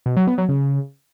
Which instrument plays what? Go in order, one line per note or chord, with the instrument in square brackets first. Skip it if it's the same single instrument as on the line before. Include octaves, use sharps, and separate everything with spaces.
[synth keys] B2
F#3
B3
F#3
C#3